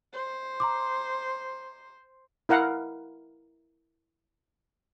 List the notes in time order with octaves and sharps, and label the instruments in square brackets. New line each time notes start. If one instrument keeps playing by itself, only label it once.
[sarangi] C5
[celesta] A#5 C6 D6
[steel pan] E4 A#4 F5 F#5